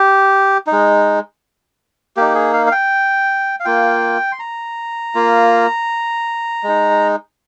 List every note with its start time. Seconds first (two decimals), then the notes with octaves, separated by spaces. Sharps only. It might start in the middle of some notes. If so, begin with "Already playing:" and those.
Already playing: G4
0.67 D#4
0.72 G#3
2.17 A#3 D#4 G4
2.35 G#4
2.53 F5
2.67 F5
2.72 G5
3.60 F5
3.65 A#3 F4 G5
4.32 C6
4.39 A#5
5.15 A#3 F4
6.63 G#3 D#4